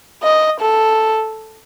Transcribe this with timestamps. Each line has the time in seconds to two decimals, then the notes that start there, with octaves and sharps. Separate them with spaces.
0.23 D#5
0.60 A4